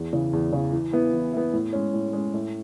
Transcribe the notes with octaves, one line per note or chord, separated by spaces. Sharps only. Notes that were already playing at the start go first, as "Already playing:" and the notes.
Already playing: E2
C#3 E3
E2
C#3 E3
E3
B3 E4
E3
B3 E4
A2
G#3 C#4
A2
G#3 C#4
A2